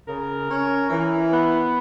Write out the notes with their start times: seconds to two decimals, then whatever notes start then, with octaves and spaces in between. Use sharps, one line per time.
0.08 C#3 A#4
0.49 C#4
0.90 E3
1.31 B3